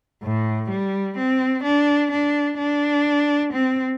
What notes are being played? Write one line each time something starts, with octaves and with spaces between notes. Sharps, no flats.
A2
G3
C4
D4
D4
D4
C4